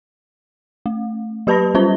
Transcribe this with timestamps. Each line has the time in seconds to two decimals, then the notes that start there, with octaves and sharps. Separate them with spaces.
0.86 A3
1.47 F#3 G4 B4 A5 B5 A#6
1.74 G3 C#4 F4 C5 G7